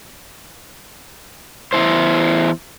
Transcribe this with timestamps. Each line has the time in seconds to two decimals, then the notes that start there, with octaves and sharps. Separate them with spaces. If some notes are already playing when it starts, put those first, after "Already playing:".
1.73 E2 G#2 E4 C5